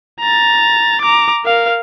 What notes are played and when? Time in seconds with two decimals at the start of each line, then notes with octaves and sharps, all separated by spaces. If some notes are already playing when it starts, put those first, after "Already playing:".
0.20 A#5 A6
1.01 A#5 D6
1.45 A#4 F5